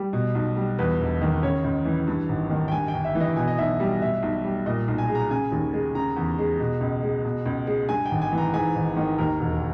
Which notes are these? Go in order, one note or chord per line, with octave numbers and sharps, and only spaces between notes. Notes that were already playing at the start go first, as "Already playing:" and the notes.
Already playing: G3
B2
B1
G3
E2 B4
E1
D#3
C#3 C#5
C#2
E3
G2
G#1
D#3
G5
G2 G#5
G5
G1
E5
E3
D#5
B2 G#5
D#5
B1 E5
G3
B2 E5
B1
G3
A#2 D#5
B1
G#5
G#3
A#5
C#3 G#5
D#2
G#3
C#3 A#5
E2
G#3
B2
C#2
G#3
B2
C#2
G#3
G2 G#5
G5
G#1
G#5
E3
A#5
G#2 G#5
G#1
D#3
D#2 A#4
E1